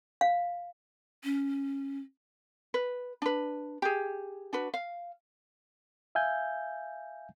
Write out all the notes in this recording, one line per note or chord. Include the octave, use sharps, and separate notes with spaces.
F5
C#4
B4
D4 B4
G4 G#4
D4 F#4 B4
F5
E5 F5 G#5 G6